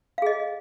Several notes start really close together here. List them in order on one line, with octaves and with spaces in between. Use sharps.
F5 G#4 D#5